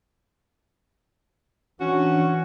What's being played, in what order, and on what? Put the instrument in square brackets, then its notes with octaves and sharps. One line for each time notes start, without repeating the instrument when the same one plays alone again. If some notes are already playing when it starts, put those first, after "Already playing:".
[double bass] E3 [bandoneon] C#4 [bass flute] D4 [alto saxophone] F#4